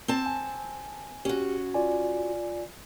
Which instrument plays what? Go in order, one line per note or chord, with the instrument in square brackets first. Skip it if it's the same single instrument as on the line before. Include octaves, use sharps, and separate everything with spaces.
[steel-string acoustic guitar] C4 A5
[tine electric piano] G#5
[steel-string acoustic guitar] C#4 F#4 [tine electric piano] G4
[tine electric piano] F4 D5 G#5